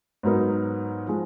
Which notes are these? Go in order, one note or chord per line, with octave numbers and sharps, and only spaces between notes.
G#2 F#3 B3 D#4 A#4
F3 G#3